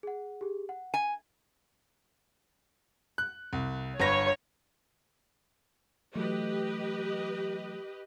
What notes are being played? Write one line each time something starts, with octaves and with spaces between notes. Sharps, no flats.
G#4 F#5
G4 G#4
F#5
G#5
F#6
C2
G1 B4 C#5 A#6
E3 F#3 A3 G4 B4 D#5